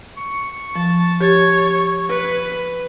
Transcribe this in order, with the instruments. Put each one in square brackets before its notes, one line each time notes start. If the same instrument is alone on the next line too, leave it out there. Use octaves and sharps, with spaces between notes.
[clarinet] C#6
[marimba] F3 [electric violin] A5
[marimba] G4 A6 [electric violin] C#5
[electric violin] B4